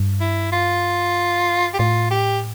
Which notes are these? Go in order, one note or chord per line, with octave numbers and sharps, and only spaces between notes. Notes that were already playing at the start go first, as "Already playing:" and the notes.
Already playing: G2
E4
F4
G4
A2 F4
G4